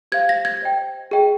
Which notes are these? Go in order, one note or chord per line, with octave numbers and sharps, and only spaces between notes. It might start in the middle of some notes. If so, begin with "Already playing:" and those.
G4 C5 F5 G#6
A#6
G#6
C5 D#5 G5
G#4 D#5 G5